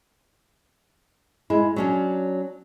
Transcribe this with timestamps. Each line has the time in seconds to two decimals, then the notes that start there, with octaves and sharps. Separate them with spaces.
1.50 G#3 E4
1.76 F#3 C#4 D4